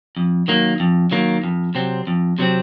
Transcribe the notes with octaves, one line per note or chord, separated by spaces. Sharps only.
F2
D#3 F#3 A#3
F2
D#3 F#3 A#3
F2
C3 F#3 C4
F2
C3 F#3 C4